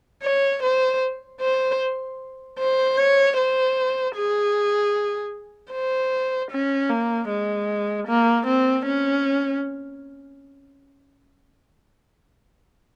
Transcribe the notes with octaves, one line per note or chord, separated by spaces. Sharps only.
C#5
C5
C5
C5
C#5
C5
G#4
C5
C#4
A#3
G#3
A#3
C4
C#4